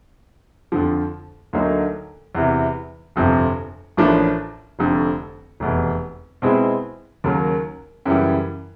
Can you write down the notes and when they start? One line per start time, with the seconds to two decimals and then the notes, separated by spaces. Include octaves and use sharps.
0.72 F2 D3 F3
1.53 D2 D3 F#3 A#3 D#4
2.35 E2 C3 E3
3.16 G1 F2 C3 F3
3.97 A1 A2 F3 A#3 D4
4.79 F1 F2 D3
5.60 F1 E2 B2
6.42 B2 G#3 C4 E4 G#4
7.24 D#2 C#3 F#3 A#3
8.05 F#2 C#3 E3 G3